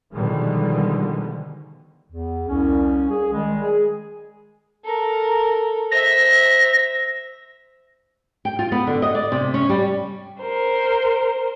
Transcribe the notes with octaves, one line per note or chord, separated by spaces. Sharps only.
B2 D3 D#3 F3 G3 G#3
E2
C2 C#4
G#4
D#3 G3 G#3
G#4
A4 A#4
C5 E5 A#6
G5
F4
B3
D3
D#5
D5
C3
C#4
G3
A#4 C5